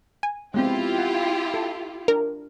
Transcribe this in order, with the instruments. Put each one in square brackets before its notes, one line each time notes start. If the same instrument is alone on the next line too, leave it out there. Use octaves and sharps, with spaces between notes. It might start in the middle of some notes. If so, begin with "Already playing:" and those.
[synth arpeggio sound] G#5
[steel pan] G#3 B3 C4 [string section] E4 F4 G4
[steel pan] F#5
A4
[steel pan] D4 [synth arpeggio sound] A#4